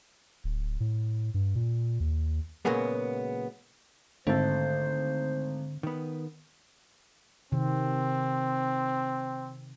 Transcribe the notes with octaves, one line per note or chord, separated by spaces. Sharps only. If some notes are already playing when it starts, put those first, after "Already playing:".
D1
A2
G2
A#2
D#2
A#2 C#3 F#3 G#3 A#3 B3
G#1 D3 A3 A4 C5
D#3 B3
C3 D#3 C4